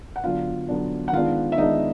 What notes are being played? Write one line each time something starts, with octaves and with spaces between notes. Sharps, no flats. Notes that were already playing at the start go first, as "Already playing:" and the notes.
F#5
D3 F#3 B3 D4 F4 F5
D3 F#3 B3 D4
F#5
D#3 G#3 B3 D4 F4 F5
E5
D#3 G#3 B3 D4 D#4 D#5